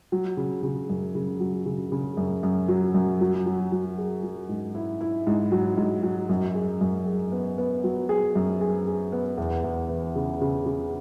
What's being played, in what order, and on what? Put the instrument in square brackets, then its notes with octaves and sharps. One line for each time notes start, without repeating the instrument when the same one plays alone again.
[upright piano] F#3
C#3
C#3
F#2
C#3
F#3
C#3
C#3
F#2
F#2
F#3
F#2
F#3
F#3
F#3
G#4
F#3
G#2
E4
E4
G#2
F#3
G#2
F#3
F#2
G#4
F#2
G#4
B3
B3
F#3
G#4
F#2
G#4
G#4
B3
E2
E2
E3
C#3
C#3
C#3